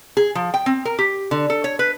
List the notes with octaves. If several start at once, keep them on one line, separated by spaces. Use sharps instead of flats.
G#4
F3
G5
C4
A#4
G4
D3
A4
C#5
B4